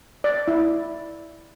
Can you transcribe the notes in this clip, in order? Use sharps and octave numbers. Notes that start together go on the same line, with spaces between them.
D5
E4